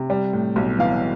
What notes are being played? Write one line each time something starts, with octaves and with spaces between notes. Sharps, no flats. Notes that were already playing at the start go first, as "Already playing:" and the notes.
Already playing: C3
G3
A2
B1
E3 F5